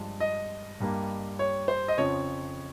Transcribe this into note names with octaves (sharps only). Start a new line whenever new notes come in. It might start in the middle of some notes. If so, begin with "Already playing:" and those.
Already playing: G2 F3 G#3
D#5
G2 G3 A#3
C#5
C5
D#5
F2 C#3 F3 C#5